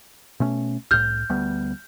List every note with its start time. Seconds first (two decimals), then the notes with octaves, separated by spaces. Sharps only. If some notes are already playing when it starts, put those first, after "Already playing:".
0.40 B2 A3 C#4
0.91 C2 A2 F6 G6
1.29 D2 G3 B3